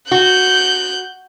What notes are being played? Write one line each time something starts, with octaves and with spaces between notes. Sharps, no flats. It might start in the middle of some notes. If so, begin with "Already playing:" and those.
F#4 F#6 G6